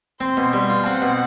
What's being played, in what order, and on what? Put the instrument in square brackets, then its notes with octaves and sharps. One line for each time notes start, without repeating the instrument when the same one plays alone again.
[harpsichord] C4 [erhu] C6
[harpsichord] B2
[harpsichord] G3 [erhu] C6
[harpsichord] F4
[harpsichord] C4 [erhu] F#5
[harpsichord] B2